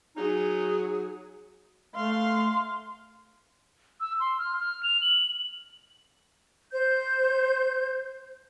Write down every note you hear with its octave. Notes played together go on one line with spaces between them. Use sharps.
F#3 D#4 G#4
A3 F5 C6
E6
C6
F6
F6
F7
F#7
C5 G6